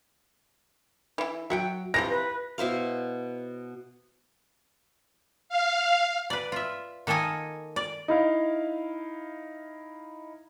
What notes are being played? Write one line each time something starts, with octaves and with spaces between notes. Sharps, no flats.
E3 E4
F#3 E5 F#5 G5
C3 E3 F3 A#6
B4
B2 E4 C5 F5
F5
B4 D5
F4 E5
D#3 A#3 A4 D#5 G#5
D5
D#4 E4 F5